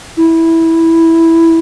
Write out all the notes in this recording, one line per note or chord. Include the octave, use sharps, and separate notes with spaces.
E4